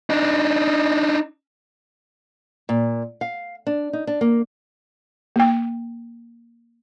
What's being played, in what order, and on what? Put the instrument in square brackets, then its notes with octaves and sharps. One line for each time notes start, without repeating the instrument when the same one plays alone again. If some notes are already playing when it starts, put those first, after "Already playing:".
[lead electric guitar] D4 D#4
[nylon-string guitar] A#2
F5
D4
D#4
D4
A#3
[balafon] A#3 G5